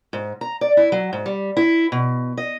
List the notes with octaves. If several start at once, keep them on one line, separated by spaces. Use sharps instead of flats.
G#2
A#5
D5
E4
F#3
G#2
G3
E4
B2
D#5